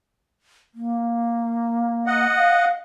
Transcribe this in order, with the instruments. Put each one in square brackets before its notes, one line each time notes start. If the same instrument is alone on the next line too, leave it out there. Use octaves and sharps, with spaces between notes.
[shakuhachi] A#3
[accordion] D#5 F#5
[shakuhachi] F5